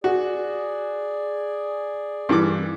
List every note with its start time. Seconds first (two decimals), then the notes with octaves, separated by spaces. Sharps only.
0.04 F#4 G#4 D5
2.29 G2 E3 D6